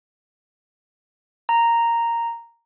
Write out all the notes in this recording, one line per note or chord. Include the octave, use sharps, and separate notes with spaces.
A#5